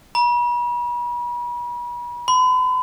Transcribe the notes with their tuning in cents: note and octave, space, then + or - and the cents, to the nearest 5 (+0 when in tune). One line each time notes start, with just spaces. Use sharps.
B5 -40
B5 +45